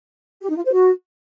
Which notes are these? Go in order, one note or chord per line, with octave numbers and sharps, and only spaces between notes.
G4
D#4
F4
C5
F#4